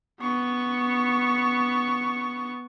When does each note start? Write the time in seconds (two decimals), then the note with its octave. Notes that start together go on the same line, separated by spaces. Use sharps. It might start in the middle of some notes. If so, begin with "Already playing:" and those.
0.20 B3 C#6